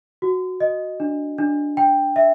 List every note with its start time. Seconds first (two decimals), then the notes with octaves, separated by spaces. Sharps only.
0.22 F#4
0.60 D#5
1.00 D4
1.38 D4
1.77 G5
2.16 E5